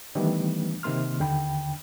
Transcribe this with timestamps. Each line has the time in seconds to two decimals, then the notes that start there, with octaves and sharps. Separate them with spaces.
0.15 D#3 E3 G3 A3 B3 D4
0.83 C3 D#3 A#3 C6 F6
1.20 D#2 D3 G5 B5